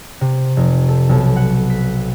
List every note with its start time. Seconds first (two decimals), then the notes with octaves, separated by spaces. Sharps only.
0.21 C3
0.57 F1
0.89 A4
1.09 B1
1.36 F#5
1.70 B6